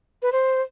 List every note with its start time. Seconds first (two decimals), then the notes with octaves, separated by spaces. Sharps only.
0.22 B4
0.32 C5